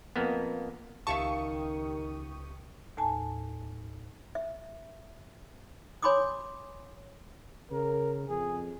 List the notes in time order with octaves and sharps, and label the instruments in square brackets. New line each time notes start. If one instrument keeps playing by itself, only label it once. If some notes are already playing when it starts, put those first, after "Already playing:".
[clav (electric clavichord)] F2 A#3 B3
[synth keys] C#2 G4 D#6 [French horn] D#3 [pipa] E5 F5 A5 [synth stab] C#6
[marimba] D#2 A2 G#5 A5
[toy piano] E5
C#5 G#5 B5 C6 D6 D#6
[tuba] C#3 [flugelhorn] A#4
[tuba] F2 [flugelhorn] G#4